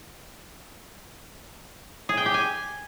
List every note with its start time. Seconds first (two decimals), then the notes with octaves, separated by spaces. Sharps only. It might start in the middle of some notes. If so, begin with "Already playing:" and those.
2.09 G#4
2.17 G5
2.26 G4
2.34 G#5